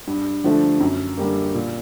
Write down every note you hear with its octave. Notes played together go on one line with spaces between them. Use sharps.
G2
D3 F3 A3
F#2
D3 G3 A#3
A#2